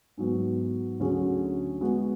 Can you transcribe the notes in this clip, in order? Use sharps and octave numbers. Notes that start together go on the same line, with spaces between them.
G#2 F#3 B3
D2 D3 F#3 C#4 G#4
G#3 B3 F#4